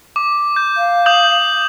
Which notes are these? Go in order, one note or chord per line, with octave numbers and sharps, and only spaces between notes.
D6
G6
F5
D#6 G6 F#7